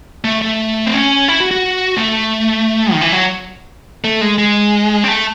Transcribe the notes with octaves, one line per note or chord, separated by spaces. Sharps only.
A3
A3
C4
C#4
E4
F#4
F#4
A3
D#3
E3
F#3
A3
G#3
G#3
C4
A3